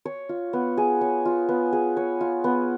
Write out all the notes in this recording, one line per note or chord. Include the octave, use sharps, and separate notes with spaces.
C#5
F4
B3
G#4
C#5
F4
B3
G#4
C#5
F4
B3